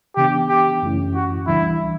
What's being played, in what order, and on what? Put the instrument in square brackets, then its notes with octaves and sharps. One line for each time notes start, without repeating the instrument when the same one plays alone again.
[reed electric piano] C#3 E3 B3 D4 [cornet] G4
[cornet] G4
[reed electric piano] F#2 E3 A3 C#4 E4
[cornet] F#4
[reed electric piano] C#2 C#3 E3 G3 D4 [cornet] E4